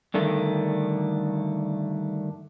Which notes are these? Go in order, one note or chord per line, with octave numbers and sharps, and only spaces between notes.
G2 D3 D#3 A3